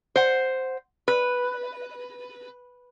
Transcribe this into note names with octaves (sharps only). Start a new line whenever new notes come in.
C5 F#5
B4